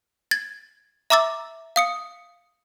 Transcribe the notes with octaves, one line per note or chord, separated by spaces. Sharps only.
G#6 A6
E5 A#5 D6 E6 A6
F5 D#6 C#7